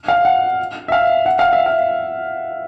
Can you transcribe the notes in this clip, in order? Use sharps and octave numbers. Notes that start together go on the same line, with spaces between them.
F5
F#5
E5
F5
F#5
F5
E5
F5